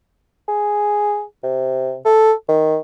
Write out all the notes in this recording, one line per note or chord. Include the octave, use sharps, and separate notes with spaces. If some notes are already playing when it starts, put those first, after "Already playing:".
G#4
C3
A4
D#3